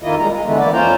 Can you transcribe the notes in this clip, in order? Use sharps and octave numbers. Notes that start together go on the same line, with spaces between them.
F2 D#3 A#3 E4 F4 D#5
G3 G#3 A#5
G#3
D3 E3 G#3 A3 B3
E3 A#3 E4 D5
F2 C#4 F4 C5 G5 A#5